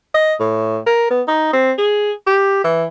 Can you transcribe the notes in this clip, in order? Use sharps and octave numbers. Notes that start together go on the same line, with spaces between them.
D#5
A2
A#4
B3
D#4
C4
G#4
G4
E3